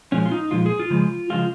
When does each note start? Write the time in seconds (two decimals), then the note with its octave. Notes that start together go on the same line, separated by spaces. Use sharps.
0.12 A#2 F3 G#3 C#4
0.25 F4
0.32 D#4
0.51 A#2 F3 G#3 F4
0.66 G#4
0.79 F4
0.90 C#3 F3 G#3
1.30 C#3 F3 G#3 F4